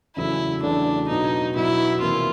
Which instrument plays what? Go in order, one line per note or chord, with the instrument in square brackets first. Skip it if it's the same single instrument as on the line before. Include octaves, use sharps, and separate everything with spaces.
[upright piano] E2 C#3 F#3 A3 [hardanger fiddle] E4
[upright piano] E2 C#3 F#3 A3 [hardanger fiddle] D4
[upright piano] B2 F#3 B3 [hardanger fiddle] D#4
[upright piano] B2 F#3 B3 [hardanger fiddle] E4
[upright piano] E2 C3 F3 A#3 [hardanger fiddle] F4